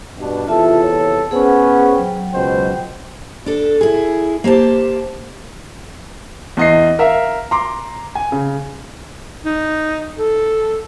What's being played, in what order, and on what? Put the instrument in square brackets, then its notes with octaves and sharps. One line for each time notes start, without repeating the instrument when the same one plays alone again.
[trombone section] G2 B2 D4
[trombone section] E2 C3 A4 [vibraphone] F4 E5 A5
[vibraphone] C#5
[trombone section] B3 C#4 [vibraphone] G#4 C5 F#5
[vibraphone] F#3 G5
[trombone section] C#2 B2 C5
[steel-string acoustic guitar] D4 A4
E4 G#4
A#3 G4 C5 A5
[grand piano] E2 D#5 C7
A#4 E5 F5
A#5 C6 D6
G#5
C#3
[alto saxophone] D#4
A4